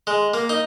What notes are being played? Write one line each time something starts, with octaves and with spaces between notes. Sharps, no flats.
G#3
A#3
D#4